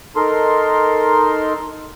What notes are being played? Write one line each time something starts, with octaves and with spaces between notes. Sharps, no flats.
D#4 A4 A#4 C6